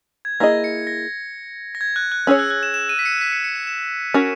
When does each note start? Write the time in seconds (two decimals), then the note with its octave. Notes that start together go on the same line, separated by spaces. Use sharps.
0.25 G#6
0.40 A#3 E4 G#4 D#5 A#6
0.64 C#7
0.87 A#6
1.75 A#6
1.81 G#6
1.96 F#6
2.12 F#6
2.27 C#4 G#4 C#5 E6
2.39 F#6
2.50 F#6
2.63 E7
2.74 E7
2.89 D#7
2.99 B6
3.05 C#7
3.21 B6
3.32 C#7
3.44 C#7
3.56 E7
3.67 E7
4.14 C#4 F#4 A#4